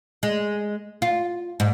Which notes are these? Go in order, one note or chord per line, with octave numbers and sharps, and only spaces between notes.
G#3
F4
G#2